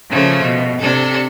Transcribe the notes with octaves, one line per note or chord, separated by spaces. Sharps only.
C#3 F3 A3 A#3
B2
C3 D4 A4